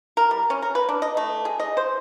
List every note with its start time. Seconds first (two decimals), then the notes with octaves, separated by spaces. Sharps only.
0.17 A#4
0.31 G3
0.50 C#4
0.62 A#4
0.75 B4
0.89 D4
1.02 D#5
1.17 A3
1.45 G#4
1.60 D#5
1.77 C5